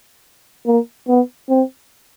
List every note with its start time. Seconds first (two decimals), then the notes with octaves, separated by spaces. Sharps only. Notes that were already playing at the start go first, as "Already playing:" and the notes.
0.66 A#3
1.08 B3
1.49 C4